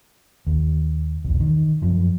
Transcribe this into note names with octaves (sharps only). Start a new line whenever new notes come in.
D#2
B1 E2
D#3
F#2 F3